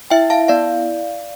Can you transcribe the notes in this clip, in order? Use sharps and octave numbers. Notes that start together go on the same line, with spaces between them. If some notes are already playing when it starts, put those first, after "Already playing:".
E4 E5 G5
F5 A5
B3 D5 F5